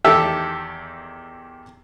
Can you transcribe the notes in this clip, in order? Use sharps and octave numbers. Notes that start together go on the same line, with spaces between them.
E2 D#3 G4 A4 E5 E6